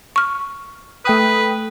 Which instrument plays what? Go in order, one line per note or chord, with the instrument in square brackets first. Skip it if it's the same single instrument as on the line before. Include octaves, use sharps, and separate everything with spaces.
[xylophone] C#6 F6
[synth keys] A3 G5 D#6 [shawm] B4